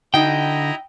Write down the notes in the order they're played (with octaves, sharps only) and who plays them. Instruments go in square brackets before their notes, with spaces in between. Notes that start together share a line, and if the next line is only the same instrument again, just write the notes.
[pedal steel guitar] D3 [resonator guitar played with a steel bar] D#4 F#4 [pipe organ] E4 D#5 A#5 [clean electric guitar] G5